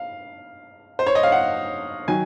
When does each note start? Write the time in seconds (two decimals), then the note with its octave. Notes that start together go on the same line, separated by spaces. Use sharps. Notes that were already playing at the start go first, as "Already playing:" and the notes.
Already playing: F5
0.99 C5
1.07 C#5
1.15 D#5
1.23 F5
1.32 F#5
2.08 D#3 F#3 G#5